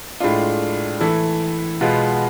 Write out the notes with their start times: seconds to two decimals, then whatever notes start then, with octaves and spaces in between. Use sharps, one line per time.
0.20 A2 G#3 D4 F4
1.01 E3 A3 E4
1.81 B2 G#3 B3 F4